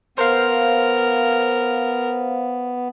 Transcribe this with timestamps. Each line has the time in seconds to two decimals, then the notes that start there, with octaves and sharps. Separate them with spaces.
0.18 B3 A#4 C5 F5